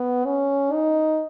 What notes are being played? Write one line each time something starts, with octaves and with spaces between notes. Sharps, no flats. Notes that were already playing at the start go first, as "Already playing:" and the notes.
Already playing: B3
C#4
D#4